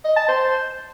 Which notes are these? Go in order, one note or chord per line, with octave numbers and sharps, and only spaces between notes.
D#5
A5
C5